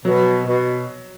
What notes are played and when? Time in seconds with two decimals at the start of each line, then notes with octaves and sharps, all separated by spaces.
0.05 B2 F#3
0.46 B2